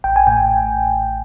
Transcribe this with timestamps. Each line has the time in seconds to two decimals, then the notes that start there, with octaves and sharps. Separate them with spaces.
0.04 A1 G5
0.16 G#5
0.27 A2 G5